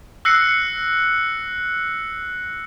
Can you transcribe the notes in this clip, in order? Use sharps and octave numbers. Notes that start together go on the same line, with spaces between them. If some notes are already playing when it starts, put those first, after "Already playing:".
E6 F#6 A#6 C7 C#7